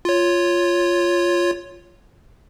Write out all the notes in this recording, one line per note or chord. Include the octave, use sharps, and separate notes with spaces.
F4 C#5